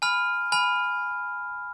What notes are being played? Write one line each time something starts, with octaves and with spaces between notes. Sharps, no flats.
G#5 B5 F6
G#5 B5 F6